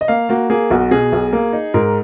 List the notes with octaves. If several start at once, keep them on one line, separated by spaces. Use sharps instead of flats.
D#5
A#3 F5
A#3 F#4
A#3 G#4
B1 F#4
B2 G#4
B1
A#3
D#4
G#2 A#4